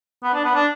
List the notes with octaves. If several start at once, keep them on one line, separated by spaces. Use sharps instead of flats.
B3
D4
B3
D4